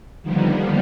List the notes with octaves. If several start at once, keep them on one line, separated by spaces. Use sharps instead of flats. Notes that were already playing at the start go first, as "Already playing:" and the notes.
D3 D#3 F3 G3 A#3 B3